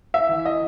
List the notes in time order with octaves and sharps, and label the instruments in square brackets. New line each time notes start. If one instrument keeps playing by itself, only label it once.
[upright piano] E5
E3
D#5